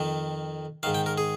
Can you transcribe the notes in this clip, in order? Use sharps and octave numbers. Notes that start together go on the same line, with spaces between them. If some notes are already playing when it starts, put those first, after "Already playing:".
Already playing: F2 D#3
G#2 D#3 F5
G5
A#4
G#4